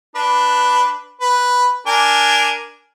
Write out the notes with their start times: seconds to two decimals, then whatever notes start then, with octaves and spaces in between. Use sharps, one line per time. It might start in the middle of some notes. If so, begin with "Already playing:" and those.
0.15 D4 B4
1.21 B4
1.87 D4 A#4 G#5